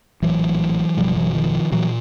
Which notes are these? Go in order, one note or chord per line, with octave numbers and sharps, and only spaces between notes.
A#1 A2 E3 F#3
F#1 E2 B2 F3 G3
E3 F#3
D#3 F3
A#2 E3 F#3